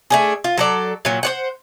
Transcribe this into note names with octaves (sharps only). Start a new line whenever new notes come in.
A3 D4 G#4
F4
F#3 A4 D5
A#2 F#3
C5 C#5 F#5